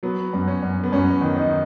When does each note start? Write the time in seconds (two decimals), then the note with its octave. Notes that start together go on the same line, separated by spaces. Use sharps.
0.03 F#3 B3
0.33 F#2
0.48 C#4
0.62 F#2
0.84 B3
0.92 F#2 C#4
1.21 D#3
1.36 D#4